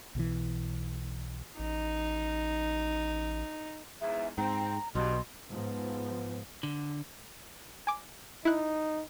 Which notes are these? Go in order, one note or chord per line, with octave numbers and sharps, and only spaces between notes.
B1 B2 D#3 E3
A1 D#4
E2 G#2 E5
G#2 C4 A#5
B1 G2 B2 C6
G#2 F3 B3
D3
G#5 D6
D#4 E4 F#6